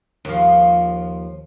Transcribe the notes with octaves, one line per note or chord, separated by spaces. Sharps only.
D#2 F3